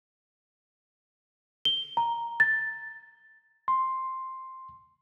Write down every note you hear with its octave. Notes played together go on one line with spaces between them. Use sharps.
G7
A#5
A6
C6